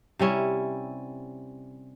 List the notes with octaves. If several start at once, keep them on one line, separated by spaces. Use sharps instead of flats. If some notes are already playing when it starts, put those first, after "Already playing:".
C3 G3 C#4 E4